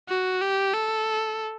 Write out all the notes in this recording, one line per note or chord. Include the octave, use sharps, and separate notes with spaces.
F#4
G4
A4